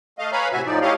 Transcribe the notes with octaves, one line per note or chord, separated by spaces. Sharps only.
A3 D#5 F5
B4 C#5 F5 G#5 A#5 B5
A2 C3 F#4 E5 G#5
A2 F3 D#4 D5
A3 E4 G4 C#5 D#5 F5